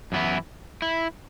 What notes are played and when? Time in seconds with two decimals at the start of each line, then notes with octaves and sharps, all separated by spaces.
0.12 F#2 E3 B3 E4
0.82 E4